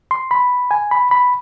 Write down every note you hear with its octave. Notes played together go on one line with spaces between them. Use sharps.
C6
B5
G#5
B5
B5